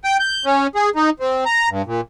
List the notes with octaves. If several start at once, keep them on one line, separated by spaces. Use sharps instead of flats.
G5
G6
C#4
G#4
D#4
C4
A#5
G2
A#2